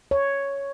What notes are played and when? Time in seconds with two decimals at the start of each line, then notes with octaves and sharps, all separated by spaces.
0.11 C#5